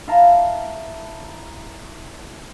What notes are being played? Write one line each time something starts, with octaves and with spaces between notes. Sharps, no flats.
E4 F5 A5 A#5